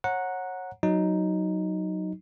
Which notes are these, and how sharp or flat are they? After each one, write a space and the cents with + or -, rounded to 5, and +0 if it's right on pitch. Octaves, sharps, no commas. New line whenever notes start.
C#5 -25 F#5 -10 A#5 +0
F#3 +0 D#4 +0